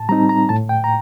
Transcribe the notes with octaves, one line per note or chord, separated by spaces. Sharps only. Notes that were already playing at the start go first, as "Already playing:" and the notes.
Already playing: A2 A5
G3 C4 D#4 A#5
A#5
A2 A5
G5
A#5